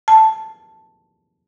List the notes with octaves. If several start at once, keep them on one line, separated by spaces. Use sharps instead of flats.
A5